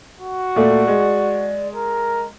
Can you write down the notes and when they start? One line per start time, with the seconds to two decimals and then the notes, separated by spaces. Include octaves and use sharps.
0.21 F#4
0.56 A#2 A3 A4 D5
0.88 G#3
1.75 A#4